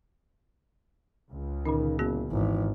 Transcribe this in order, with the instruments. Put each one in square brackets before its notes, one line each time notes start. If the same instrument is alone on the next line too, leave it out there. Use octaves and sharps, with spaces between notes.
[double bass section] C#2
[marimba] A#2 D3 C#4 [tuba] D#3
[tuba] F#1 [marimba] B3 F#4 G#4
[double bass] G#1 [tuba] E3